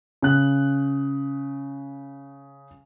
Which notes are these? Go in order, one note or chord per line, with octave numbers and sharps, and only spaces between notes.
C#3 F#6